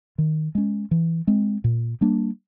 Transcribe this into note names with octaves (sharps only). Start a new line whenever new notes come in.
D#3
G#3 C#4
E3
G#3 C4
A#2
G3 A#3 D4